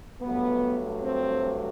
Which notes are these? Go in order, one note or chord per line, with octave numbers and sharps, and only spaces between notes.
G2 F#3 A3 B3
C4